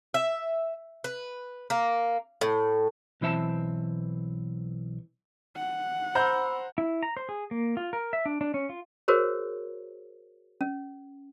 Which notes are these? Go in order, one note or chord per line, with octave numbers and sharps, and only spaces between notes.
E5
B4
A#3
A2
B1 E3 C4 E5 A5
F#5
C5 A#5 B5 E6 G6
E4
A#5
C5
G#4
A#3
F4
A#4
E5
D4
D4
C#4
F4
F#4 G#4 A#4 C5 C#5
C#4